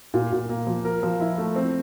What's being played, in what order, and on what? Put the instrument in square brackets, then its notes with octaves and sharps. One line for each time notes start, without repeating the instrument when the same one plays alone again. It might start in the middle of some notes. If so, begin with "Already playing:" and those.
[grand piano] A#2
A#2
A#3
F3
A#4
F3
E4
A3
C4